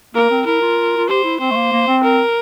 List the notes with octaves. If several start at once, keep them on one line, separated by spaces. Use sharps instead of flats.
A#3 A#4
C4
E4 A#4
F4
F4
G4 C5
E4
C4 C5
A3
A#3
A#3
C4
A#4